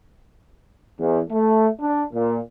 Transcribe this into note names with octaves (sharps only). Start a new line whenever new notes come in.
E2
A3
D4
A#2